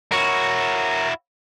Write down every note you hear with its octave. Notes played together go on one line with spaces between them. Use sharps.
E4 F#4 A#4 C#5